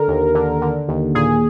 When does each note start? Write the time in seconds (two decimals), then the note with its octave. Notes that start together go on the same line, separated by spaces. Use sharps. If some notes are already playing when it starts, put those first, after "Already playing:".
Already playing: D3 A#4
0.08 D#2
0.35 D3
0.62 D3
0.88 D#2
1.15 A#2 G#4